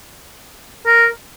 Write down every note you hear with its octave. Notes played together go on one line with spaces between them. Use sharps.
A#4